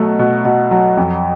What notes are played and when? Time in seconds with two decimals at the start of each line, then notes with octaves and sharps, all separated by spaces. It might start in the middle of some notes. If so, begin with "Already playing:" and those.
Already playing: B2 F#3 A3
0.19 B2
0.45 B2
0.71 F#3
0.97 F2